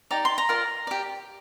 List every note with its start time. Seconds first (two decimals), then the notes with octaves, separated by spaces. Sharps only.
0.11 D#4 G4 D5 A#5
0.25 C6
0.38 A#5
0.49 F4 A#4 D5
0.87 G4 D5